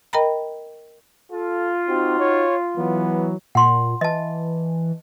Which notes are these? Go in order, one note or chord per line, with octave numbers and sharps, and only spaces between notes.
A#4 D#5 G5 A#5 B5
F4 A4
C4 D#4 F#4
C#5
E3 F#3 B3
A#2 F#5 C6
E3 D#5 A5